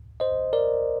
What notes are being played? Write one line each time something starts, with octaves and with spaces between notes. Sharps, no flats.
C5 D#5
A#4 D5